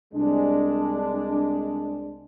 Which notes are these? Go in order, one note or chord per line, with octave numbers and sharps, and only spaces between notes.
C2 G#3 D4